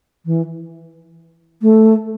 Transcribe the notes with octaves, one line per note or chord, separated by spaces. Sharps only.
E3
A3